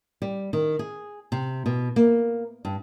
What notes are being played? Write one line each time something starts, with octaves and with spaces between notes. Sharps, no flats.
G3
D#3
G#4
C3
B2
A#3
G2